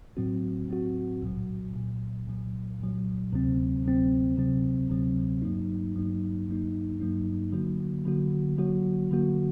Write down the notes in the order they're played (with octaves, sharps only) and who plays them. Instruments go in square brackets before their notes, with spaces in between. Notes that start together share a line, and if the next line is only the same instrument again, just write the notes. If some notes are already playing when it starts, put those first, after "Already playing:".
[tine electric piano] A2 F#3 C4 F#4
A2 F#3 C4 F#4
C2 A#2 F#3
C2 A#2 F#3
C2 A#2 F#3
C2 A#2 F#3
D2 C3 F#3 C4
D2 C3 F#3 C4
D2 C3 F#3 C4
D2 C3 F#3 C4
G2 F#3 A#3 D#4
G2 F#3 A#3 D#4
G2 F#3 A#3 D#4
G2 F#3 A#3 D#4
D3 F#3 A#3 F#4
D3 F#3 A#3 F#4
D3 F#3 A#3 F#4
D3 F#3 A#3 F#4